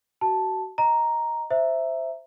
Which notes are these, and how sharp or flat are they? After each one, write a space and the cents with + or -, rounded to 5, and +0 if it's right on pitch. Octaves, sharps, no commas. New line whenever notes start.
F#4 +30 A5 +0
D#5 +0 A#5 +0
C5 +0 E5 +0 A#5 +0